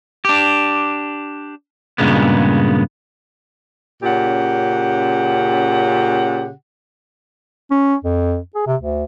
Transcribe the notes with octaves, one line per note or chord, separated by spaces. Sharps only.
D4 G4
G2 A#2 C#3 G#3 B3
A#2 C#3 C#4 G4 F#5
C#4
F2
G#4
C3
D2